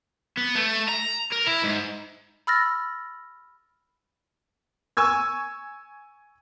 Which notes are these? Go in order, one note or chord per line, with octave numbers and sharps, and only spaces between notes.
B3
A3
A#5
A#4
E4
G#2
B5 E6 F6 A6 A#6
G#5 C#6 E6 G#6